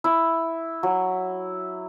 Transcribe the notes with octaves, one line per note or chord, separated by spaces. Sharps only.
E4
F#3